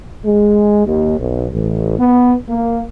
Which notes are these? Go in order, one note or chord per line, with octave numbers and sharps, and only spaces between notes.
G#3
D#2
B1
A1
B3
A#3